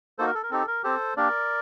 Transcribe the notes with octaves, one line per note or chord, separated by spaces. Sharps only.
A#3 D#4 F#4 A4 C5
A#4
A4
A#4
C4 D#4 G4 A4
A#4
C4 G4 A4 C5
A#3 D4 G4 A#4 D5